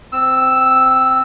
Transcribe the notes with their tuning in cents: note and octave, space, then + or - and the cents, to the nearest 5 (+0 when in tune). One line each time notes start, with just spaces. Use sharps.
C4 -15 E6 +0